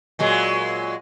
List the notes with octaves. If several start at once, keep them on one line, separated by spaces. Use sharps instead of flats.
A#2 F#3 G#3